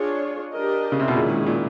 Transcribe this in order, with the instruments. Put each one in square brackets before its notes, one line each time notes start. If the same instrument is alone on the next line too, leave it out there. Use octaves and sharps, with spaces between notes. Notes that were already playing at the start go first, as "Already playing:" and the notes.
Already playing: [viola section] D4 F4 G#4 C#5
D4 G4 A#4 D#5
[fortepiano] C#3
C3
B2
[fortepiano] A#2 [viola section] D#3 G#3 C#4 E4 G#4
[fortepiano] A#2